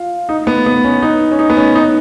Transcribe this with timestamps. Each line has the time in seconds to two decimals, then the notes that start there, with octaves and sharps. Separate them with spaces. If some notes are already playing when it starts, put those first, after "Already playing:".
Already playing: F4
0.29 D#4
0.47 B3
0.66 B3
0.84 C#4
1.02 D#4
1.31 C#4
1.39 D#4
1.50 B3
1.57 C#4
1.75 D#4